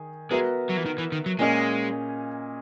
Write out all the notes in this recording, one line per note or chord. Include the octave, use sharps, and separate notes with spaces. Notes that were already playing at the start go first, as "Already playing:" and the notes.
Already playing: D#3 G#4
G#3 B3 F#4 A#4 E5
F#3
E3
D#3
E3
D#3
F#3
A#2 G#3 A#3 C#4 G#4 D#5